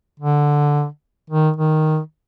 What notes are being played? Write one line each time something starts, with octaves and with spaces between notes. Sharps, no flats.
D3
D#3
D#3